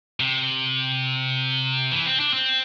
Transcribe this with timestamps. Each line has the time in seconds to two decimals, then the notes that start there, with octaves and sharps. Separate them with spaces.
0.20 C3
1.92 E3
2.06 C4
2.20 D4
2.33 C4